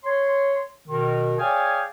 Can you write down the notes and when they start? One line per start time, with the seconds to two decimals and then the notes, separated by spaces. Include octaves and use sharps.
0.04 C#5 C6
0.89 B2 D#3
1.39 G#4 C#5 D5 F5 G5 G#5